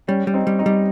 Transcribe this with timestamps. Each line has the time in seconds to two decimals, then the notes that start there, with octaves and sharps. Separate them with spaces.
0.08 G3 C#4
0.27 G3
0.34 C4 D#4
0.47 G3
0.59 C4 D#4
0.66 G3